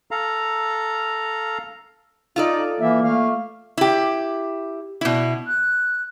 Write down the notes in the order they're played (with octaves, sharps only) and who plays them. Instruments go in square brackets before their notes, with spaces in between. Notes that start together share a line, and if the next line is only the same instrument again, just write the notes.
[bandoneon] A4 F5 A#5
[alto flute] D#4 [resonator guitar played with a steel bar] F4 A4 D5
[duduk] E3 [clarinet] A#3 [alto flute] E5
[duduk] A3 [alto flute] F5
[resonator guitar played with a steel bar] E4 G4
B2 E4
[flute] F#6